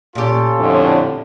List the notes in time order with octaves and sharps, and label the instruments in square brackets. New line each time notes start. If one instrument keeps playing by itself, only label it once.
[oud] A#2 G4 [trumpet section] C#4 F4 A4
[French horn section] F2 A2 D3